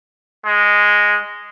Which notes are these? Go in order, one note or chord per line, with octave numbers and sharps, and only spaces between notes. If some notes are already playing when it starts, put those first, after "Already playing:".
G#3